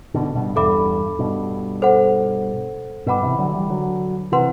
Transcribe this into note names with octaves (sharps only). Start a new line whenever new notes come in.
B2 D3
G2 B2
E2 G2 A4 E5 B5 D6
G2 B2
A4 C5 F#5
G2 B2 B4 F#5 B5 D6
C3 E3
D3 F#3
E3 G3
D3 F#3
C3 E3 B4 F#5 C6